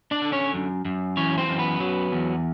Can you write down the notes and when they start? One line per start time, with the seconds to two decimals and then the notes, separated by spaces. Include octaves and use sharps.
0.11 D4 D5
0.22 D3
0.32 C#4 C#5
0.54 F#2
0.85 F#2
1.17 E3 C#4 C#5
1.38 C4 C5
1.49 F#2
1.59 B3 B4
1.80 F#3
2.12 E2